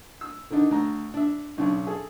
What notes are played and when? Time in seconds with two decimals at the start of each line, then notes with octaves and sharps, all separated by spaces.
0.21 E6
0.50 D3 D#3 D4 D#4
0.71 D2 A#5
1.14 D4 E5
1.58 B1 C#3 D4
1.87 G#4 A4